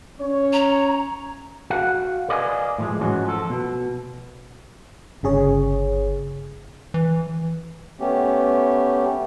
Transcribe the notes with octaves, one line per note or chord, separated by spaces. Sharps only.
C#4 C#5
A#5
F#4 F5 F#5
A#4 B4 D5 D#5 F5 G#5
A2 F3 G#3
G#2 E3 F#3 C#4 F#4
F3 A4
B2
G1 C#3 G#4 C#5
E3
A3 B3 C#4 G4